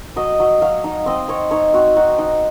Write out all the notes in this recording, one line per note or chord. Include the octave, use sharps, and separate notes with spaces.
F#3 D#5
F#3
F#3 F5
D#4
C4 D#5
C4 C#5
D#4 C#5
C4 F#4
D#4 F#4
D#4